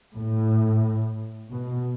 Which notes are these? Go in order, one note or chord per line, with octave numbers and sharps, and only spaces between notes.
A2
B2